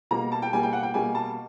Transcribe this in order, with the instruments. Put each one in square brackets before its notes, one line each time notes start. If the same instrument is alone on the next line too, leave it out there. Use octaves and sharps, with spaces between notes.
[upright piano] B2 G3 A#3 A#5
A5
G5
B2 G3 A#3 G#5
G5
F#5
G5
B2 G3 A#3 G#5
A5